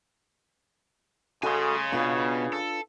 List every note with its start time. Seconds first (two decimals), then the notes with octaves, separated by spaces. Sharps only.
1.43 C#3 F#4 A4 D#5 G#5 C6
1.92 B2 D4 F4 B4
2.53 A4